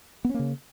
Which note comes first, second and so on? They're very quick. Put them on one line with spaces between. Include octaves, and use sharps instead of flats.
B3 C#4 A#3 C#3